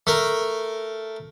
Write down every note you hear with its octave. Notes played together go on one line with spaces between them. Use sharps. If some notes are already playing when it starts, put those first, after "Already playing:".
A3 A#4